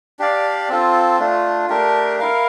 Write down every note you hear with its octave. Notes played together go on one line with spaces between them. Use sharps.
D4 G4 D5 F5
C4 F4 A4
A3 D4 F4
A3 D4 G4 A#4
E4 A#4 F5